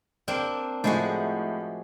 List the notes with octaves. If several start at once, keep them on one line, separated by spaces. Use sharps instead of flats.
A#3 C4 D4
A2 F3 G#3 F#4